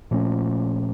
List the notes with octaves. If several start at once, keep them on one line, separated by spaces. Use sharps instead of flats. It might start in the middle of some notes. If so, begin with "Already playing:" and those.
A#2 F3 A3 C#4